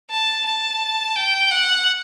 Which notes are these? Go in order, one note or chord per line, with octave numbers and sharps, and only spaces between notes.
A5
A5
G5
F#5